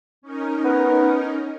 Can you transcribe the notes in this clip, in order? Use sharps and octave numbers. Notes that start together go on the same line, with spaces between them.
C#4 D#4 A#4
B3